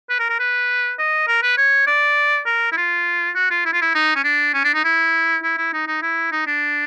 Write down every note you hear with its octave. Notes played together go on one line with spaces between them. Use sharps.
B4
A#4
A#4
B4
D#5
A#4
B4
C#5
D5
A#4
E4
F4
F#4
F4
E4
F4
E4
D#4
C#4
D4
C#4
D4
D#4
E4
E4
E4
D#4
D#4
E4
D#4
D4